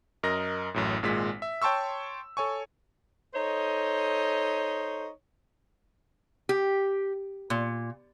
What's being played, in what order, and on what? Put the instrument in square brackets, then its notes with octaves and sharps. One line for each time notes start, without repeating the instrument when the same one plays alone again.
[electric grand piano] F#2 A#4 D#5 A#6
A1 F#2 A2
G#1 A#2 G#3 B6
E5
C#5 G5 A5 C6 C#6 E6
A4 C#5 G#5 C#6
[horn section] D#4 A4 C5 C#5 D#5
[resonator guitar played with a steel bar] G4
A#2